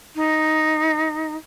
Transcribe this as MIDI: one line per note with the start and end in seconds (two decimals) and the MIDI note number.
0.15 1.35 63